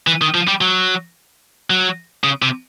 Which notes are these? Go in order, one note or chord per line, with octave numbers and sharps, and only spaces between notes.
E3
D#3
F3
G3
F#3
F#3
C#3
C3